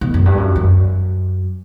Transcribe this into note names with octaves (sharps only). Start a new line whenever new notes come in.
B2
F#2
G2
F#2
F#2